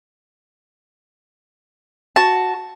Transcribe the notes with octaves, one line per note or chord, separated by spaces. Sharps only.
F#4 A5